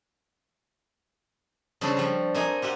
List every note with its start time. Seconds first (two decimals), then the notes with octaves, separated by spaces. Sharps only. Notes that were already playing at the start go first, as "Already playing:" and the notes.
1.81 C#3 G3 C4 D4 A4
1.97 F3 G3
2.34 C3 A#3 D#4 G#5
2.62 F4 G4 E5 F#5